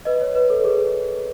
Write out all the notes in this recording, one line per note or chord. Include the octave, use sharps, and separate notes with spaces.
B4 D#5
C#5
B4
A4
G#4